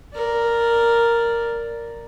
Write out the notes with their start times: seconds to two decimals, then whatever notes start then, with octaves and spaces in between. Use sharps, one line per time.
0.15 A#4 D5